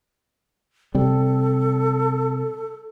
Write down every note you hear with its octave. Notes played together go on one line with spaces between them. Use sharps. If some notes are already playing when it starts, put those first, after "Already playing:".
C3 G3 A4